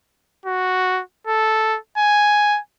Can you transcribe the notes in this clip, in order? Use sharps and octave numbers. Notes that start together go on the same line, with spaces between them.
F#4
A4
G#5